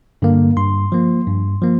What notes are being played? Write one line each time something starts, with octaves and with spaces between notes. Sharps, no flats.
G2 D3 A#3
G2 C6
F3 A#3
G2
F3 A#3